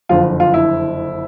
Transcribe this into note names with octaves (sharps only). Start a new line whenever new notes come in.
F#1 F2 D3 F4
F4
E4